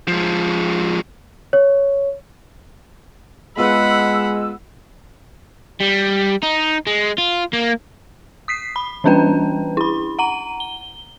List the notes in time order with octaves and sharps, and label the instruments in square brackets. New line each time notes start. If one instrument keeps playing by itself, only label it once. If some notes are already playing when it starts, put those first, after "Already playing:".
[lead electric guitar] F3 G#3
[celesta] C#5
[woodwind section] G#3 E6 [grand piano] B3 F4 B4 [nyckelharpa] F#5 B5
[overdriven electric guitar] G3
D#4
G#3
F4
A#3
[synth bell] D#6 B6 C7
B5
E3 G3 C#4 D4 B4 G5
E4 B5
F#5 A#5 D#7
G7